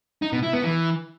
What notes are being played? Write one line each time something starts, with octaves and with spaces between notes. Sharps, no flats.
D#4
B2
E4
B3
E3